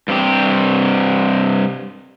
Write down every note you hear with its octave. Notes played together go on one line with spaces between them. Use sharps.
G2 C3 C4 G4